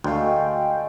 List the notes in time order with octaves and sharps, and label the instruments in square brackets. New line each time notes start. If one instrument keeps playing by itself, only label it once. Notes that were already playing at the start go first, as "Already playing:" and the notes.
[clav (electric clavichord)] D2 [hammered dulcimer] G#3 A3 [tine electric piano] F#4 D5 F5 [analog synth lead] G5